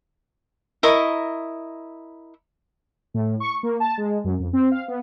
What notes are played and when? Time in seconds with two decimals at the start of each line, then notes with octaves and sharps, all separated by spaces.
0.83 E4 A#4 D#5 C#6
3.14 A2
3.40 C#6
3.63 A#3
3.80 A5
3.98 G#3
4.24 F#2
4.40 F2
4.53 C4
4.72 F5
4.88 B3